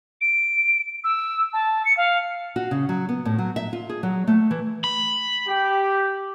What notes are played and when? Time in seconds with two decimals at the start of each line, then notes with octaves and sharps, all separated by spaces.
0.21 D7
1.04 E6
1.53 A5
1.85 C#7
1.97 F5
2.56 F#4
2.71 C#3
2.89 F#3
3.09 B3
3.25 A2
3.38 F#3
3.56 E5
3.73 F4
3.90 G#4
4.03 F#3
4.28 A3
4.51 E3
4.84 B5
5.48 G4